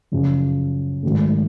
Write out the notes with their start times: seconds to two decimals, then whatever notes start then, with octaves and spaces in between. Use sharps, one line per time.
0.12 F#2 C#3 F3
1.03 G#2 D#3 F#3 A3